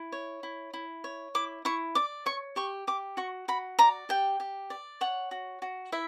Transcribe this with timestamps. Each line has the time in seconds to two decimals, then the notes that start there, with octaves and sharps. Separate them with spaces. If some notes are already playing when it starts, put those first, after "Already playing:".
Already playing: E4
0.12 C#5
0.43 E4
0.74 E4
1.04 C#5
1.35 E4 D6
1.65 E4 C#6
1.95 D5 D6
2.26 C#5 C#6
2.56 G4 C#6
2.87 G4 D6
3.17 F#4 C#6
3.48 F#4 B5
3.79 D5 A#5
4.09 G4 G5
4.40 G4
4.70 D5
5.01 C#5 F#5
5.31 F#4
5.62 F#4
5.92 E4 E5